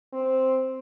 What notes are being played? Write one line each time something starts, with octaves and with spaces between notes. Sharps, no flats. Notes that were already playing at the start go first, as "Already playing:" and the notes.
C4